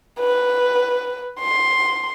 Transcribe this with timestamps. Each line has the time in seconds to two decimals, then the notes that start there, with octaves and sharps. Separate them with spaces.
0.20 B4
1.40 C6